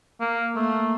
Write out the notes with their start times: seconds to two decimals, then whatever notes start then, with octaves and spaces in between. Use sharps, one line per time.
0.21 A#3
0.56 A3 A#3